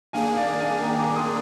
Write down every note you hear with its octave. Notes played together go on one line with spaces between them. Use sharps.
D#3 A#3 D4 G#4 F5 G#5
D5 F5
F5 G#5
G5 A#5
A#5 D6
C6 D#6